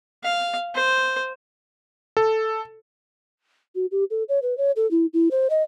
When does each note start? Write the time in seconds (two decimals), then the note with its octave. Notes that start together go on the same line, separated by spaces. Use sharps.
0.24 F5
0.75 C5
2.17 A4
3.75 F#4
3.91 G4
4.10 A4
4.29 C#5
4.42 B4
4.58 C#5
4.76 A4
4.91 E4
5.14 E4
5.31 C5
5.50 D#5